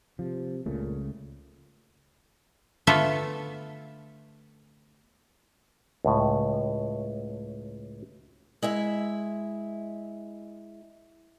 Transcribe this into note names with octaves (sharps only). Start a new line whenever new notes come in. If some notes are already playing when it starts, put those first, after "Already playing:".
C3 F3
C#2 A#2 C#3 A3
D3 A3 B3 F4 A4 E5
C#2 A2
G#3 E4 E5